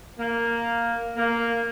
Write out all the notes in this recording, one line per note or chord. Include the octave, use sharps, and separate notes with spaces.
A#3
A#3